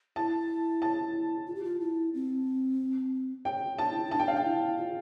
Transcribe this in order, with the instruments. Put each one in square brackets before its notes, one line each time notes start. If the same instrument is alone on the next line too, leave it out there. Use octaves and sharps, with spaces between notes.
[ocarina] E4 [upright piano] A5
[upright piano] A5
[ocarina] F4
G4
F4
E4
C4
[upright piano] G5
[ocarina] D4 [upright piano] A5
[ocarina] E4
E4
[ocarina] D4 [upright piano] A5
[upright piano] G5
F5
[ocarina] D4 [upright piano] G5
[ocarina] E4
F4